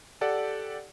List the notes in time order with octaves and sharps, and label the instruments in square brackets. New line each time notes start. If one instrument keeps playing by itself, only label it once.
[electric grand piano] G4 A4 D5 F#5